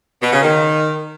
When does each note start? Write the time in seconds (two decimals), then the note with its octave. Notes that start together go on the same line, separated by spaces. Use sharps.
0.23 B2
0.33 C#3
0.43 D#3